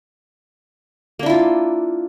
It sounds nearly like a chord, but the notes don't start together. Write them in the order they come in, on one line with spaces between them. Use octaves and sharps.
A#3 D4 E4 F4